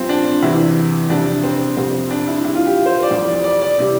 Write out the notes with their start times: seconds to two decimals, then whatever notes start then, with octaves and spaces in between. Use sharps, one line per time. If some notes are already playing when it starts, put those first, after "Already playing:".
Already playing: G2 F3 C4
0.09 D4
0.43 E2 C3 E3 G3 E4
1.10 F2 C3 G3 D4
1.43 C4
1.76 F2 C3 G3 C4
2.11 D4
2.27 E4
2.44 A2 E3 G3 E4
2.55 F4
2.66 G4
2.86 C5
3.03 D5
3.11 F2 E3 G3
3.28 D5
3.44 D5
3.62 D5
3.78 C3 E3 G3